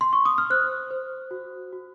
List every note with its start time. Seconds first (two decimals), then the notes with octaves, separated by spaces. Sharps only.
0.01 C6
0.13 C#6
0.25 D#6
0.38 F6
0.50 C5 F#6
0.91 C5
1.31 F#4
1.73 F#4